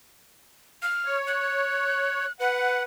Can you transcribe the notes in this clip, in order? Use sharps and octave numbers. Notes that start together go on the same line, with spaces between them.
F6
C#5
F#6
B4 F#5